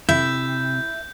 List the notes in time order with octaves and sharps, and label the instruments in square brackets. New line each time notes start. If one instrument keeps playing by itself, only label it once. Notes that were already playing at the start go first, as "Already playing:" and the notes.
[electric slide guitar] C3 [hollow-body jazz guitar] E4 [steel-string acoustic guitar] E5 [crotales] G6